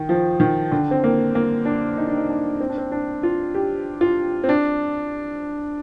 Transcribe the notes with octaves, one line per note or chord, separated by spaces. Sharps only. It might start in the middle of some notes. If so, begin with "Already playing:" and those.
Already playing: D#3
F3
D#3
D3
C4
A#3
A#3
D4
D#4
D4
D#4
D4
C4
D4
C4
D4
F4
G4
F4
C4
D4